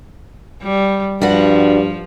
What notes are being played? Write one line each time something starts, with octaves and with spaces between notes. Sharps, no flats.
G3
G2 F3 G3 D4 F#4